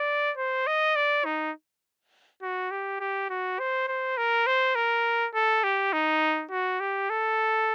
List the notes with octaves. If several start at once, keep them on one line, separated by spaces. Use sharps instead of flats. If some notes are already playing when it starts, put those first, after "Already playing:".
Already playing: D5
C5
D#5
D5
D#4
F#4
G4
G4
F#4
C5
C5
A#4
C5
A#4
A4
G4
D#4
F#4
G4
A4